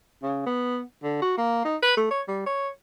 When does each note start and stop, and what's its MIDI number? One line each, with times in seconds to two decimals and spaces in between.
0.23 0.45 49
0.46 0.81 59
1.03 1.21 50
1.22 1.37 66
1.38 1.63 58
1.65 1.76 63
1.83 1.93 71
1.97 2.06 57
2.10 2.21 73
2.28 2.45 55
2.46 2.68 73